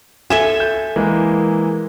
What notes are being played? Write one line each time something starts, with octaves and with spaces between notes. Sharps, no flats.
A4 E5 G#5 G#6 E7
G6
E3 G#3 A#3